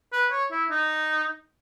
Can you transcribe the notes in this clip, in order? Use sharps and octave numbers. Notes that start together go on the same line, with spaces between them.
B4
C#5
E4
D#4